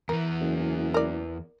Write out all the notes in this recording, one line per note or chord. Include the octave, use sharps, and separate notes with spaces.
E2 E3 A#4
F#1
A#4 D5